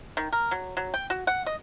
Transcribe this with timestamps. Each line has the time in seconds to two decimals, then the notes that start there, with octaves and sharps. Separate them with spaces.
0.17 D#3
0.33 A#4
0.51 F#3
0.77 F#3
0.94 G5
1.10 F#4
1.27 F#5
1.47 D#5